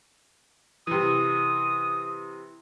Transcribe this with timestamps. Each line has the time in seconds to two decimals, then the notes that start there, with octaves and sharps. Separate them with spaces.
0.87 C3 E3 D#6